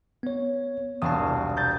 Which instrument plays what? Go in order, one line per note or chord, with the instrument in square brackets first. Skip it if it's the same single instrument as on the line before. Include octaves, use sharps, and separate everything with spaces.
[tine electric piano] B3 C#5
[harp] E1 C2 C7 [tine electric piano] A5 D#6
[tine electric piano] A#5 G6 A6